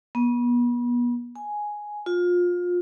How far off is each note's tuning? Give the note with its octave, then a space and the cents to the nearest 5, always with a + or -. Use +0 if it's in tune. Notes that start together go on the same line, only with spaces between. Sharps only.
B3 -35
G#5 +5
F4 +25